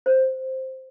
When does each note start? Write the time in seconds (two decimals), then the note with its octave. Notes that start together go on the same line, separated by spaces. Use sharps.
0.06 C5